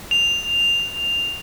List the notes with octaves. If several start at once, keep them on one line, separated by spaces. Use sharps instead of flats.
F7